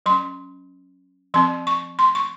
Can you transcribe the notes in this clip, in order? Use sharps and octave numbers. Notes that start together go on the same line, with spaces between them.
F#3 C#4 C6
F3 C4 C6
C#6
C6
C#6